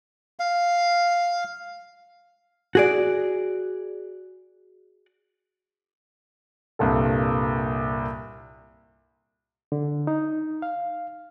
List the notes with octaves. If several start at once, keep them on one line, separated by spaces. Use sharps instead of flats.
F5
F#4 G#4 D5
C2 G2 A#2 A4
D3
D#4
F5